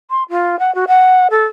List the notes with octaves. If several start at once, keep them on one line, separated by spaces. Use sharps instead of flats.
C6
F4
F#5
F#4
F#5
A4